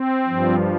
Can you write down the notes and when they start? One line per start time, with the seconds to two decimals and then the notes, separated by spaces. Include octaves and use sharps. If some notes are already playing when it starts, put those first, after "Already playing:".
Already playing: C4
0.26 G2 F3